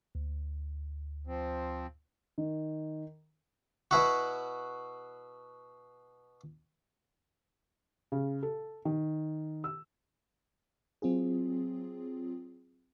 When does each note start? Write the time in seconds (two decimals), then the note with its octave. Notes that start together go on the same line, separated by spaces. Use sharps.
0.15 D2
1.27 F3 C4
2.38 D#3
3.91 B2 E4 F#4
8.12 C#3
8.43 A4
8.85 D#3
9.64 E6
11.02 F#3 C4 F4 G#4